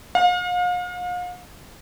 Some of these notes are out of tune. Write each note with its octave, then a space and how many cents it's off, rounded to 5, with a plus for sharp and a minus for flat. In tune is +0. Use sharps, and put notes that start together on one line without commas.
F5 +40